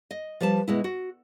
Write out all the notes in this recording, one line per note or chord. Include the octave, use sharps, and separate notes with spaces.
D#5
F3 G3 B4 A5
B2 G#3 E4
F#4